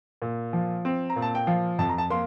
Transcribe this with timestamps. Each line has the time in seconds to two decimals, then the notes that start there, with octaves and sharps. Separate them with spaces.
0.22 A#2
0.53 F3
0.85 C4
1.10 A#5
1.16 A#2
1.22 A5
1.35 G5
1.47 F3 F5
1.79 F2 A5
1.89 A#5
1.98 A5
2.10 A#3 C6